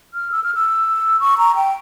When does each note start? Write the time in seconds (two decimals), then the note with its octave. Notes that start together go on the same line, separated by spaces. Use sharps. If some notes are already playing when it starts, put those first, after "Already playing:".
0.14 F6
0.32 E6
0.44 F6
0.55 E6
1.20 C#6
1.38 A#5
1.56 G5